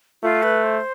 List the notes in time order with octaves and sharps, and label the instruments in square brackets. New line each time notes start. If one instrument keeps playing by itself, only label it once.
[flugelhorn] A3 [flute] F4
[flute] B4
C5